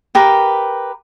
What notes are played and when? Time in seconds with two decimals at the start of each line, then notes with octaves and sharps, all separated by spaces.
0.15 G4 A#4 B4